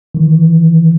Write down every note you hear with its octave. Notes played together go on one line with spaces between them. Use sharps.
D#3 E3